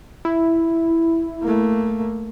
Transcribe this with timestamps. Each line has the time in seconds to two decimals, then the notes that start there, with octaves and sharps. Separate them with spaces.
0.25 E4
1.42 A3 A#3